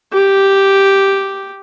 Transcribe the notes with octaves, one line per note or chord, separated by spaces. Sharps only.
G4